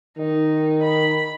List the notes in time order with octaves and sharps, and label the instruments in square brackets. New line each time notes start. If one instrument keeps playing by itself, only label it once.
[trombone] D#3 [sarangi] D#4
[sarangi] B5